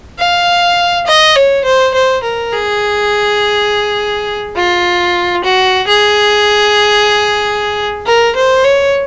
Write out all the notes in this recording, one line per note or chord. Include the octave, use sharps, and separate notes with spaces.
F5
D#5
C#5
C5
C5
A#4
G#4
F4
F#4
G#4
A#4
C5
C#5